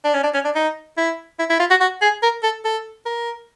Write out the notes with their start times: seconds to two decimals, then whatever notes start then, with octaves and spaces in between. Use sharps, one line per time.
0.04 D4
0.14 C#4
0.23 D4
0.34 C#4
0.45 D4
0.55 D#4
0.97 E4
1.39 E4
1.50 E4
1.59 F4
1.70 F#4
1.80 F#4
2.02 G#4
2.22 A#4
2.43 A4
2.65 A4
3.05 A#4